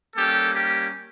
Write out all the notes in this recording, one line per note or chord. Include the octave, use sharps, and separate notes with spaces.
G3 A#3 C#4 G4 A4
G4